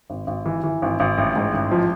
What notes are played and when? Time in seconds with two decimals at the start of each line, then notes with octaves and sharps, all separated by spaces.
0.10 G#1
0.27 G#1
0.46 E3
0.63 E3
0.82 G#1
1.00 G#1
1.18 A1
1.36 G#2
1.54 A1
1.71 F3